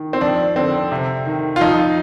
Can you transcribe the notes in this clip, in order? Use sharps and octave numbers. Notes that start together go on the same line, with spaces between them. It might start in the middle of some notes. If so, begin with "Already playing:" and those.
Already playing: D#3
C4
F2 D4
D3 C4
C3
D#3
F4
F2 D#4